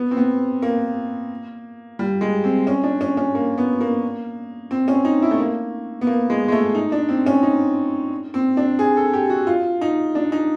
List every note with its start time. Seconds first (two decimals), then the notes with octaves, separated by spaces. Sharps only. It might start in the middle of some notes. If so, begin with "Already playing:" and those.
Already playing: B3
0.11 C4
0.17 B3
0.62 A#3
1.99 G3
2.21 G#3
2.44 C4
2.67 C#4
2.84 D4
3.01 C#4
3.17 C#4
3.35 A#3
3.58 B3
3.81 A#3
4.71 C4
4.88 C#4
5.05 D#4
5.22 E4
5.31 A3
5.39 A#3
6.01 B3
6.07 A#3
6.30 G#3
6.48 G#3
6.52 A3
6.75 D#4
6.92 D4
7.09 C4
7.26 C#4
7.43 D#4
8.34 C4
8.57 D4
8.79 G#4
8.97 A4
9.13 G4
9.30 F#4
9.47 F4
9.81 D#4
10.15 D4
10.32 D#4